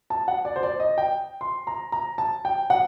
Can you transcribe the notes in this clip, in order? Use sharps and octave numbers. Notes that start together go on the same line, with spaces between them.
A5
F#5
D5
C5
D5
D#5
G5
C6
A#5
A#5
A5
G5
F#5